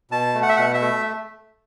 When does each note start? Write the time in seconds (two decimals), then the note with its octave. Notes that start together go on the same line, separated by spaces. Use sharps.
0.11 B2 A5
0.35 A3
0.42 F#5
0.49 E5
0.56 B2 F#5
0.74 E5
0.81 A3